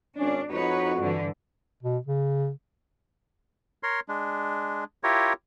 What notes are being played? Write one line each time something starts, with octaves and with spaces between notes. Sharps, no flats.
G#1 C#4 D4
F2 D#4 F#4 B4 C#5
G2 D3 E3
B2
C#3
A#4 C#5 C6
G#3 D4
E4 F4 G4 A#4 C#5